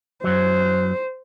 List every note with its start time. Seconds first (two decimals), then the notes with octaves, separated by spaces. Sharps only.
0.24 F#2 F#3 C5